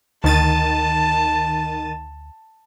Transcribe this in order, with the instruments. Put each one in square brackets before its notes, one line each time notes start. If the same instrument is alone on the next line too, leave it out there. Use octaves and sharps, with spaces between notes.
[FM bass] D2 [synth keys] D#3 A6 D#7 [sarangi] A5